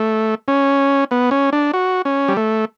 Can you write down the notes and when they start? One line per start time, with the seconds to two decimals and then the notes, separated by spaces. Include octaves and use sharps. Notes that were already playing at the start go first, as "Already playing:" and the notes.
Already playing: A3
0.48 C#4
1.11 B3
1.31 C#4
1.53 D4
1.73 F#4
2.05 C#4
2.28 G3
2.37 A3